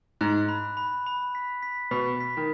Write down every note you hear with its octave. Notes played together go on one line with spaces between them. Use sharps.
G#2 F#6
B5
B5
B5
B6
B6
B2 B5
B6
D#3